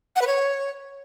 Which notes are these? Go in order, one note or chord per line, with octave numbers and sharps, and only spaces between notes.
F#5
B4
C#5